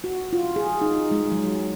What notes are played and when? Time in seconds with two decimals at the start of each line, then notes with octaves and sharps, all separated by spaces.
0.04 F#4
0.33 F4
0.56 G#4
0.82 D#4
1.11 G#3
1.32 F#3